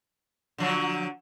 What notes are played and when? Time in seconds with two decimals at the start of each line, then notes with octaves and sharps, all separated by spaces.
0.58 D3 F3 F#3